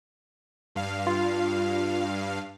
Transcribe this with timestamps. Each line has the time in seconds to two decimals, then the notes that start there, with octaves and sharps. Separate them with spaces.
0.75 G2 F5
1.07 F4